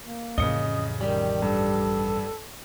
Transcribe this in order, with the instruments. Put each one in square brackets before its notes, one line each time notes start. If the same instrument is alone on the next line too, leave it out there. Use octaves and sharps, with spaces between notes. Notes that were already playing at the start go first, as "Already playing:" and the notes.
[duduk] A#3
[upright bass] A1 F2 [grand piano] C#3 C#7 G7 [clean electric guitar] D#5
[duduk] D#3 [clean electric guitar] G3
[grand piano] G2 [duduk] A4